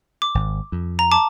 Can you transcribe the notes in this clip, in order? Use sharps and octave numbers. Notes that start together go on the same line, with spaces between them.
D6
G#1
F2
A#5
A5 D6